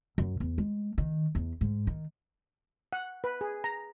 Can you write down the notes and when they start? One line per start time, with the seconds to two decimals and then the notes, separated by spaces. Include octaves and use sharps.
0.18 F#2
0.40 E2
0.58 G#3
0.98 D#3
1.35 E2
1.61 G#2
1.87 D#3
2.93 F#5
3.24 B4
3.41 G#4
3.64 A#5